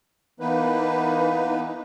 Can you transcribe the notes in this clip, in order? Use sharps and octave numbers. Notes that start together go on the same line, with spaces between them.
E3 A#3 B3 D#4 B4